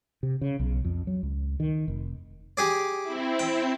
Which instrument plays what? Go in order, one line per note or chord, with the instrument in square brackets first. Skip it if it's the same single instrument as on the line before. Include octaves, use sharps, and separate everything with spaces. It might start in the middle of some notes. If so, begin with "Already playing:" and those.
[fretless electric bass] C3
C#3
B1
F2
F#3
C#2
D#3
F1
[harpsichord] G4 G#4 D5
[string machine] C4 E4
[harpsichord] G5